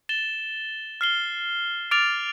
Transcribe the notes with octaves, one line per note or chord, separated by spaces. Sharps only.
A6 E7 G7
F6 C7 G7
D6 F6 A6 D7 F7